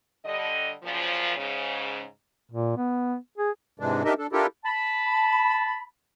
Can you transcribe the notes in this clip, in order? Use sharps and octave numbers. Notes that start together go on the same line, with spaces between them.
D3 G3 D#5
F#2 A#2 C#3 F3
G#2 C#3
A#2
B3
G#4
G#2 C3 E3 G#3 D4
D4 D#4 G4 A#4 D#5 E5
D4 A4
D4 E4 F4 G4 A4 A#4
A5 B5